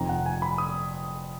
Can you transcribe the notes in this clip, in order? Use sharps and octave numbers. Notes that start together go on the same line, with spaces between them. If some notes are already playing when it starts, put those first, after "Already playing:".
Already playing: F1 F2 D#3 A#5
F#5
G#5
B5
D#6